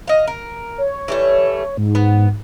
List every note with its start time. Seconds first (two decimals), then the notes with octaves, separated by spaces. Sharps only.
0.08 D#5 F5
0.28 A#4
0.78 C#5
1.08 E3 G3 A3
1.77 G#2
1.95 B3